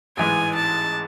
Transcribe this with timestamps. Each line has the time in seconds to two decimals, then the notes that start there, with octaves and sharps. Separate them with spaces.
0.17 A1 G#2 E3 G#3 G#5
0.55 A5